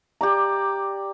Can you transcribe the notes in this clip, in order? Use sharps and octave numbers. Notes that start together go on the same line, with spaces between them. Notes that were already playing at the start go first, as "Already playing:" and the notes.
G4 D5 A#5